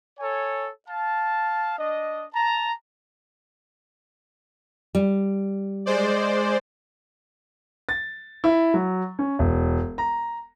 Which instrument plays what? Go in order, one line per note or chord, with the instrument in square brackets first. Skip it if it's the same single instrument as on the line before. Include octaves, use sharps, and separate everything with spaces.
[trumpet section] A4 C#5 G#5
F5 A5
D4 D#5
A5 A#5
[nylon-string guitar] G3
[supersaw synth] G#3 C5 D5
[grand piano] A6
E4
F#3
C#4
E1
A#5